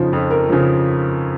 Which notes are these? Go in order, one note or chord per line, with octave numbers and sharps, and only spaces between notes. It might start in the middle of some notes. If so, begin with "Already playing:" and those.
Already playing: F2 C#3 F3 D#4
F2
A#4
C#3 F3